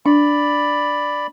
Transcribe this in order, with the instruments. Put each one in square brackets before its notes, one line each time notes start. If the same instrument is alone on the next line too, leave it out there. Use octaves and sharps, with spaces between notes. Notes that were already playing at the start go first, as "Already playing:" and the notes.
[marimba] D4 [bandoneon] D5 B5